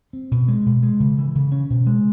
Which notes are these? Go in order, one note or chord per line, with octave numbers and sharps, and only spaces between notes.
C4
B2
G#3
B2
G#3
C#3
E3
C#3
C#4
B2
G#3